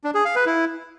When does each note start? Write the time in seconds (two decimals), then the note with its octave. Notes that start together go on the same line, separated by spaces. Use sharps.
0.04 D4
0.15 G#4
0.25 F5
0.36 B4
0.46 E4